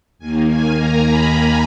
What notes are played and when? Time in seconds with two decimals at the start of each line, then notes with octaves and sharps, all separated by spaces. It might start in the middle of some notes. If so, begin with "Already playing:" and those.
0.18 D#2 D#3 A#3 G#5
0.47 G#5
0.74 A#5
1.03 B5